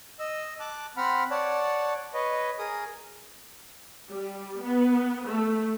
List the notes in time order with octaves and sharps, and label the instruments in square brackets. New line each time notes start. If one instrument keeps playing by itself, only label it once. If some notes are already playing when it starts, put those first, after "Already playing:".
[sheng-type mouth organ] D#5 E6
A5 D6 F#6
C4 F#5 B5 F6
C#5 D5 F#5 A5
B4 C#5 D#5
G#4 A#4 D#6
[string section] G3
B3
A3